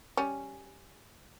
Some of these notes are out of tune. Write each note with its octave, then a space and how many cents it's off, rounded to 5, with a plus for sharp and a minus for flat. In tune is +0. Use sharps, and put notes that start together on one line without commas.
G3 +0 C#4 +0